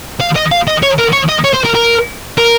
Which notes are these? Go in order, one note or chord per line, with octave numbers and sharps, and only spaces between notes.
F5
D#5
F5
D#5
C#5
A#4
C#5
D#5
C#5
C5
A#4
A#4
A#4